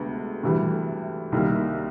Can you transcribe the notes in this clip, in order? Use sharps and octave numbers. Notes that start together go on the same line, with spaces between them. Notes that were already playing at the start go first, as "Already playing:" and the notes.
Already playing: D2 C3 G#3 B3
D2 C3 E3 G3
C2 C3 D#3 G3 A#3